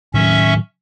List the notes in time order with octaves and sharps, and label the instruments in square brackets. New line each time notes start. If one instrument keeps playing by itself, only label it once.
[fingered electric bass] A2 D#3 F#3 [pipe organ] C#4 E5 C#6